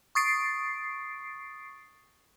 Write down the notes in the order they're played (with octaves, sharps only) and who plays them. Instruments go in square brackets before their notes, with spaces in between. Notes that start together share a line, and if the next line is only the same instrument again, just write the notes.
[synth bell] C#6 D#6 A6 C7 D7